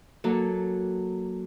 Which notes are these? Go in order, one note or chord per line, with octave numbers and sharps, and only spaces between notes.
F#3 A#3 A4